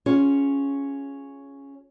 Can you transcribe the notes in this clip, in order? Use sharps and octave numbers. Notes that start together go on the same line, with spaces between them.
C#4 F4 G#4 C#5